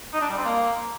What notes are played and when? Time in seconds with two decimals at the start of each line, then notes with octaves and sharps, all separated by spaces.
0.13 D#4
0.21 D4
0.29 G3
0.37 C4
0.45 A#3